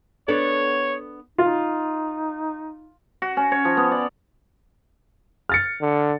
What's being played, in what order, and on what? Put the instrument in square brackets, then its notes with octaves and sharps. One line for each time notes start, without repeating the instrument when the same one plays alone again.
[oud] B3 D4 A4 [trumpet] C#5
[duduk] D#4 [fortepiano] F4
[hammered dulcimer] F#4
C#4
C#5
F3
B3
D5
[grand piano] F6 A6 C#7
[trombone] D3